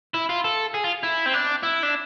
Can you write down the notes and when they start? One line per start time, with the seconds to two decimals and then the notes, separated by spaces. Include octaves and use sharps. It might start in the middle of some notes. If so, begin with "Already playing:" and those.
0.14 E4
0.29 F4
0.44 A4
0.74 G#4
0.84 F4
1.03 E4
1.26 C4
1.34 D4
1.63 E4
1.83 D4